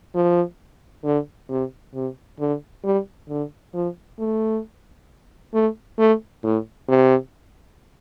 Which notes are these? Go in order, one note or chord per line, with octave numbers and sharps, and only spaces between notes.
F3
D3
C3
C3
D3
G3
D3
F3
A3
A3
A3
A2
C3